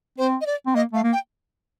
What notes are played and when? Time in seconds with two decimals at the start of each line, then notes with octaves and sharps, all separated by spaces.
0.18 C4 C5
0.41 D#5
0.46 D5
0.67 C4
0.75 A#3 D#5
0.93 A3 F5
1.04 A#3
1.13 G5